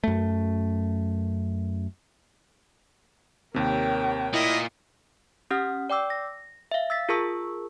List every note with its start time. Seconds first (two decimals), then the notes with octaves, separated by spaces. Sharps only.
0.04 F#2 A3
3.54 D#2 C3 A#4 C#5 G5
4.34 A#2 E4 D#5
5.51 C#4 G4 F#5 D#6 F6
5.90 D5 G5 D6 E6
6.10 A#6
6.71 E5 F5
6.90 E6 A6 B6
7.09 F4 G#4 A#4 A5 C#6 E6